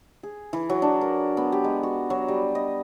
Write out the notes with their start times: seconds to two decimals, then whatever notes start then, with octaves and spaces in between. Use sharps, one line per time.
0.23 G#4
0.53 E3
0.69 F#3
0.82 D4
1.01 A#4
1.37 B3
1.52 G4
1.64 G#3
1.83 F#4
2.10 F#3
2.28 G3
2.55 D#5